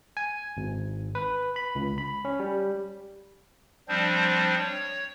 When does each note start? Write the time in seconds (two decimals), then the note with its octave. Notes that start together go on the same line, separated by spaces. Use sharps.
0.17 G#5
0.57 G#1
1.15 B4
1.56 B5
1.75 C#2
1.98 B5
2.25 C#4
2.40 G3
3.88 F3 G3 C4 D4 C5
4.59 C#5